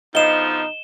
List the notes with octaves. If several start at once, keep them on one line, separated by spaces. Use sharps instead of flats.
B2 D3 F3 D#4 D#5 E7 G7